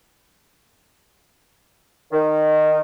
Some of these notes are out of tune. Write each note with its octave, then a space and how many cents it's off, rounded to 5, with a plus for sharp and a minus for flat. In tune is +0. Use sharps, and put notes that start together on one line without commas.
D#3 -15